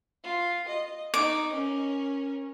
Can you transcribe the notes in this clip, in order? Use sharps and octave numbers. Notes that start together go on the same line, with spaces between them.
F4
D#5
D#4 D6
C#4 A#4